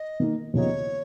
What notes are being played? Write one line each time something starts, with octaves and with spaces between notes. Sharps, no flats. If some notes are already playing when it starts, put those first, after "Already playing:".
Already playing: D#5
D#3 A#3 D#4
D#2 C#3 F3 B3 D#4 C#5